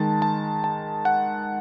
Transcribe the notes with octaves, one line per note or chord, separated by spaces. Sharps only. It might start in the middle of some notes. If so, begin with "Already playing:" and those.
Already playing: D#3 G#3 A5
A5
A5
F#5